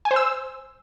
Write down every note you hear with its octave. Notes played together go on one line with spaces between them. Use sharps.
G#5
C5
E6